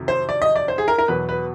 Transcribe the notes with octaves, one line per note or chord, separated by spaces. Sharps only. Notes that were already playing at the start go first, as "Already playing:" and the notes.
Already playing: F2 C3 D#3 F#3
C5
D5
D#5
D5
C5
G#4
A#4
A#4
E2 B2 F#3 B4
B4